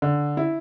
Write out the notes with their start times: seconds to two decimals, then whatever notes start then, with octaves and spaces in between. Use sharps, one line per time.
0.02 D3
0.37 E4